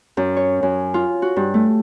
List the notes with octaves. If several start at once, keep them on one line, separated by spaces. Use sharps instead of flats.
F#2
C#5
F#2
F4
F#4
G2
A3